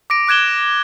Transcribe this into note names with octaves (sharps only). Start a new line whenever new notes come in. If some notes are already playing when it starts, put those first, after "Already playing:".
D6 A#6 D7
D6 F#6 G#6 E7 G7